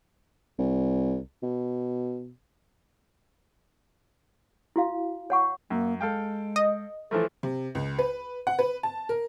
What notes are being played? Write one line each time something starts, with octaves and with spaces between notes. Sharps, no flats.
C2
B2
E4 F#4 F5
C#5 F#5 C#6
F#2 A#3
G#3 A4 F5 G5
D#5
E3 F3 A3 A4
C3
C#2
B4
F#5
B4
A5
A#4